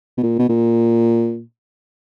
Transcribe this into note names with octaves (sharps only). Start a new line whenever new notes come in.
B2
A#2
B2
A#2